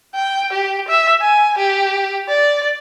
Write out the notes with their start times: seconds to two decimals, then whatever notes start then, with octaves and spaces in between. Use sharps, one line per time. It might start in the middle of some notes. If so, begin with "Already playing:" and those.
0.15 G5
0.53 G4
0.88 E5
1.21 G#5
1.58 G4
2.29 D5